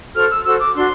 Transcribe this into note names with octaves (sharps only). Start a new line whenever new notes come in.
F#4 A4 C5 F6
E6
F#4 A4 C5 E6
D6
D4 F#4 C6